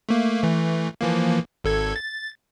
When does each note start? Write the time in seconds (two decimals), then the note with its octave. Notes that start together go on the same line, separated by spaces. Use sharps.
0.09 A3 A#3
0.43 E3 A3
1.01 E3 F3 A#3
1.64 G#1 A4 G#6
1.96 A6